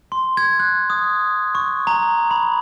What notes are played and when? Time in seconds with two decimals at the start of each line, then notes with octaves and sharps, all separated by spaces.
0.12 C6
0.37 G#6
0.59 F#6
0.90 D#6
1.55 C#6
1.87 A#5
2.31 B5